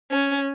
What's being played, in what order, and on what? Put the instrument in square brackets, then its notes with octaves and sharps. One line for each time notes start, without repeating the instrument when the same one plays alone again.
[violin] C#4